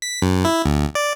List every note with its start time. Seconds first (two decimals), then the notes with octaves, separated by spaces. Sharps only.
0.02 B6
0.22 F#2
0.45 E4
0.65 D2
0.95 D5